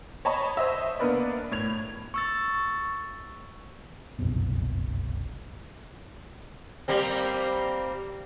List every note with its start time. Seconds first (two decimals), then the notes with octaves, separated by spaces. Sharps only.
0.25 C#5 D#5 A5 B5 C#6
0.57 C5 D#5 E5
0.99 A#3 B3 D4 A#4 B4 D5
1.51 A2 G#6 F7
2.14 C#6 E6 A6
4.19 F#1 C2 F2 B2
6.88 G3 A#3 C4